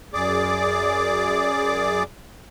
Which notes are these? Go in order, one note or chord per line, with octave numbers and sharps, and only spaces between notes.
F#2 G#4 D5 D6